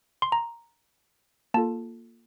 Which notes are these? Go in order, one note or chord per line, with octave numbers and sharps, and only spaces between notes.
C6
A#5
A#3 F4 A4 A5